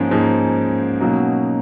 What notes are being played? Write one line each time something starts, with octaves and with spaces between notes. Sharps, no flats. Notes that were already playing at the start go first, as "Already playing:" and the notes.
Already playing: G#2 F3 A#3 C#4 D#4 G#4
G#2 F3 A#3 D#4 G#4
B2 F#3 A#3 D#4